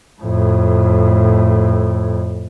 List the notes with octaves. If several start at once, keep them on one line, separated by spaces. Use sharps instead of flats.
F2 A2